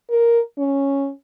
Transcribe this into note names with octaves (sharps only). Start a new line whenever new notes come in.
A#4
C#4